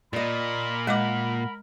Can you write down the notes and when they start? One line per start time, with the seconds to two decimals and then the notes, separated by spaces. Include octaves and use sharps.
0.13 A#2 A#4 D5 D#5 B5
0.87 G#3 D#5 F#5 D6